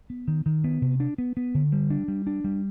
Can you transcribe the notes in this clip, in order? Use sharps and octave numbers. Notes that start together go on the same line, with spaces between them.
B3
D#3
D#3
B3
C3
D4
B3
B3
D3
G3
D4
G3
D4
G3